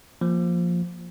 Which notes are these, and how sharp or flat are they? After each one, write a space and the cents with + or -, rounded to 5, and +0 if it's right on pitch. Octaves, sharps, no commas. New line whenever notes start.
F3 +0 A#3 +0